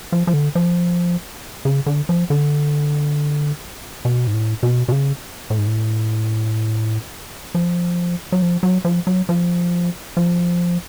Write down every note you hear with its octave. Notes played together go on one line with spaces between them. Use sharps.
F3
F3
D3
F3
C#3
D3
F3
D3
B2
G#2
A2
B2
B2
C#3
A2
G#2
A2
F3
F#3
F3
F#3
F3
F#3
F3
F3